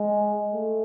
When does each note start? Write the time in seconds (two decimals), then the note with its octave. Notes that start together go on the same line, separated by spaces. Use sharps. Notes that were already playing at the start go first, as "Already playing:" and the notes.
Already playing: G#3
0.54 A3